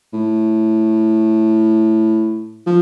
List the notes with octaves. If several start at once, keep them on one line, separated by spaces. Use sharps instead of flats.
A2
F3